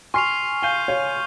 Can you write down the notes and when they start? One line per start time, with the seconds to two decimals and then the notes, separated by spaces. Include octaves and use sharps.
0.14 G#5 C6 C#6 F6 C7 F7
0.62 F5 G#5 G6 C7 D#7 G7
0.88 C#5 F5